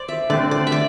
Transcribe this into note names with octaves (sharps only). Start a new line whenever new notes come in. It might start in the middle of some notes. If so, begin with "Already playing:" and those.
Already playing: C5 D5
E5
D3 A3 C4 D5
D5
E5
D5